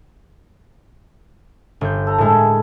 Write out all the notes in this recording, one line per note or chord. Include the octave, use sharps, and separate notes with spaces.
G1 G6
A4 A#5
A2 G#3 E4 A#4 A5